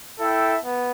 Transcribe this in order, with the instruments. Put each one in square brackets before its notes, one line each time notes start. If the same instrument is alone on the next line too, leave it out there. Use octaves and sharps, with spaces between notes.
[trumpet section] E4 A4 E5 G5
B3